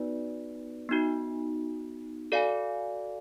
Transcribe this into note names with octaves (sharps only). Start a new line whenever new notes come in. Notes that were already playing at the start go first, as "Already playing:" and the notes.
Already playing: B3 D#4 F#4 B4 D5
B3 D#4 F#4
F#4 A4 D5 F5 G#5